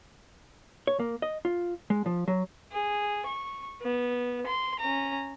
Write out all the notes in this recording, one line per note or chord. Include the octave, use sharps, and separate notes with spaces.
C#5
A#3
D#5
F4
G#3
F3
F#3
G#4
C#6
B3
C6
C#4 A#5